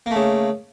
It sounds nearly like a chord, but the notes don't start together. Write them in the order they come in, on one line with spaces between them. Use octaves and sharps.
A#3 A3 C#3